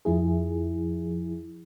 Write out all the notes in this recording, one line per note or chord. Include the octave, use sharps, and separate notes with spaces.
F2 F3 E4 G#4